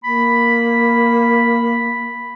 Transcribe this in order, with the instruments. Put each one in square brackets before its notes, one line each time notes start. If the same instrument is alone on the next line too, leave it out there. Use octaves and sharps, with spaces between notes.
[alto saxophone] A#3 [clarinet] B5